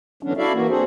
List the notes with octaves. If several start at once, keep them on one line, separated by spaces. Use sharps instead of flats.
D3 E3 F#3 B3 C#4 D4
E4 F#4 A4 D5 E5 F5
E3 A#3 F#4
C4 D4 F#4 G#4 A4 C5